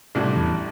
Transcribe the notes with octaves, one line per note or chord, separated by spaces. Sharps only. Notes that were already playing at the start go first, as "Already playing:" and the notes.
A1 A2 C3 G3 D4 F#4
E2 E3